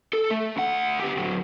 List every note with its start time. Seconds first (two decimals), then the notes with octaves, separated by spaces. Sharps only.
0.13 A4
0.31 A3
0.56 D2 F#5
1.00 B3 G4
1.17 D2 F#3